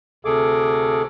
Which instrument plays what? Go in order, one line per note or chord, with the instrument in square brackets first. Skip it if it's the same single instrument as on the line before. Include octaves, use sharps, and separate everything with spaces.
[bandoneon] D2 C3 G#4 A4 D6